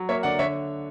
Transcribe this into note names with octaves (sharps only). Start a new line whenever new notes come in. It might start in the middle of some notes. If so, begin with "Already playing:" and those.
Already playing: F#3
A#3 C#5 E5
D3 D5 F#5
D3 C#5 E5